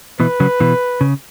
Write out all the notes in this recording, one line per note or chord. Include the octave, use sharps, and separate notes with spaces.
B2 E3 B4
C#3 F#3
B2 E3
C#3